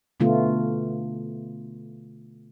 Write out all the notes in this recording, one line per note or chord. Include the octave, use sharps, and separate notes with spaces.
B2 D3 A3 B3 F4